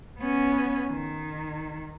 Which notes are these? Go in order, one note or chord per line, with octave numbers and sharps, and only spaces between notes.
B3 C#4
D#3